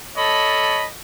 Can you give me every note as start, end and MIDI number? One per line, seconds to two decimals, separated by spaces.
0.17 0.86 69
0.17 0.86 73
0.17 0.86 75
0.17 0.86 81
0.17 0.86 83